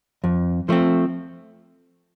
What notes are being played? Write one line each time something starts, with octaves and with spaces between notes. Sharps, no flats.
F2
F3 A3 C4